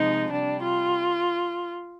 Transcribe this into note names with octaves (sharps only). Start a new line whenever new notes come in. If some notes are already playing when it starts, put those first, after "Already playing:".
Already playing: C3 F3 G#3 D#4
C3 G3 D4
F4